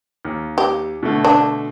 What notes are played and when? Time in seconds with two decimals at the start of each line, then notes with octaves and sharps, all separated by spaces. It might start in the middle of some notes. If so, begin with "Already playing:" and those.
0.25 D#2
0.58 G4
1.03 B2 D3 A3
1.25 D4